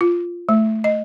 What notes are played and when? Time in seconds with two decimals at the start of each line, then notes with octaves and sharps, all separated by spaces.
0.01 F4
0.49 A3
0.84 D#5